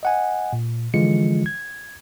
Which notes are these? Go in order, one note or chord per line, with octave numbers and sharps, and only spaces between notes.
D#5 F#5 G#5
A#2
D3 E3 F3 G#3 F4 C#7
G#6